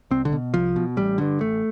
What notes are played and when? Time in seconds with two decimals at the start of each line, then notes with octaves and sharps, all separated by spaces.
0.11 C2 C4
0.25 D3
0.32 B2
0.54 C2 F3
0.76 B2
0.97 A1 G3
1.18 G2 D3
1.40 A1 A3